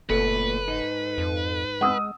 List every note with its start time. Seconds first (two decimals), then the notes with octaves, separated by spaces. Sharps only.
0.10 F#1 A#2 A3 B3 A4 B4 C#7
0.68 G#2 D#4
1.18 F2
1.81 G#3 F#5 D#6 E6